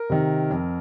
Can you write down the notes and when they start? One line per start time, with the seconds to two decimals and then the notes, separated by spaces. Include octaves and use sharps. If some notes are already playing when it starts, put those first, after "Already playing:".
Already playing: A#4
0.10 C3 D#3
0.51 F2